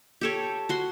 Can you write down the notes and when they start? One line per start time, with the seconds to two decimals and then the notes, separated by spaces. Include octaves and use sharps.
0.21 G4 A4 C#5
0.69 F#4 C6